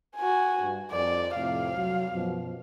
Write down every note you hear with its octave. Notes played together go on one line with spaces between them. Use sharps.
F#4 G#5
G2
F2 D5
F2 A2 C3 F5
C2 F#3
F#2 B2 F3